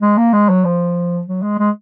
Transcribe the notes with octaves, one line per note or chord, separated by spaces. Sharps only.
G#3
A#3
G#3
F#3
F3
F#3
G#3
G#3